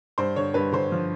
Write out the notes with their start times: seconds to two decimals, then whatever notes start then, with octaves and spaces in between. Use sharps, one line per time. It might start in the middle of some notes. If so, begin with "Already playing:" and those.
0.18 G2 C5
0.36 D3 C#5
0.54 G2 B4
0.72 D3 C5
0.92 F3